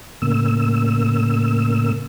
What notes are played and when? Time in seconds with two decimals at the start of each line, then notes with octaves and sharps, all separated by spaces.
0.22 A2 C#3 A#3 E6